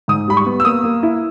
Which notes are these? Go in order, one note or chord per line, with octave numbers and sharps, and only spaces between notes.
G#2 D#6
G3 B5
C#6
B3
E6
A#3 D#6
A#3
E4